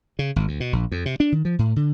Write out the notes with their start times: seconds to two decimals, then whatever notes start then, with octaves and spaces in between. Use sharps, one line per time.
0.19 C#3
0.36 G#1
0.48 D2
0.60 B2
0.73 A#1
0.92 F2
1.06 C3
1.20 D4
1.32 D#3
1.45 F3
1.59 A2
1.76 D3